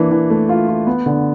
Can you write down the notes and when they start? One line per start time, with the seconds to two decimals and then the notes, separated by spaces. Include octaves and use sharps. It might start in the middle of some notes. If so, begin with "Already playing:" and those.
Already playing: E3 A#3 D4
0.11 E3
0.30 A3
0.49 F4
0.68 F4
0.86 B3
1.06 D3